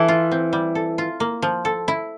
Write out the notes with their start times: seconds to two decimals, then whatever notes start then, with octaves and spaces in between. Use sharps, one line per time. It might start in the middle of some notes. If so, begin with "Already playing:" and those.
Already playing: E3 A4
0.08 F4
0.32 C4
0.53 G3
0.75 A4
0.98 F4
1.20 A#3
1.42 F3
1.65 A4
1.88 E4